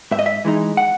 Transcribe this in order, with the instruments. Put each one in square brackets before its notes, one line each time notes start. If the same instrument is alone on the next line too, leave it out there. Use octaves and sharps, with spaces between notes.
[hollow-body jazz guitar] G#2 E5
D#5
E5
E3 G#3 D#4
F#5